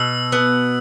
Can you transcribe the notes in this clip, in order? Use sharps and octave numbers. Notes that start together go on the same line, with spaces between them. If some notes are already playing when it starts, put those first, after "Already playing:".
Already playing: B2 E6
B3